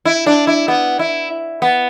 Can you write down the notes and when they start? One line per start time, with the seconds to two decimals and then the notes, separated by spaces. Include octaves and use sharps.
0.05 E4
0.26 D4
0.47 E4
0.68 B3
0.99 E4
1.62 B3